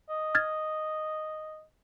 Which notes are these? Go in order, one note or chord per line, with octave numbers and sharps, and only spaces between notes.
D#5
F6 G#6 A6